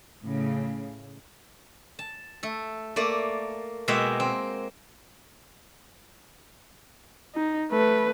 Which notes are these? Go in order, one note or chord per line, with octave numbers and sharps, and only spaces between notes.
A2 C#3
A5
A3 A4
A3 A#3 D5
B2 G#3 A#3 E5 F#5 G5
C4
D#4
A3 B4